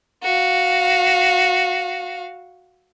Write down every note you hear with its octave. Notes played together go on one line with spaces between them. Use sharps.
F#4 F5